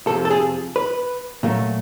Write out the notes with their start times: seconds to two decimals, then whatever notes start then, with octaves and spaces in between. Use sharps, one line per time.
0.07 F2 C3 F3 A4
0.25 A4
0.30 G#4
0.76 B4
1.43 A#2 F#3 A3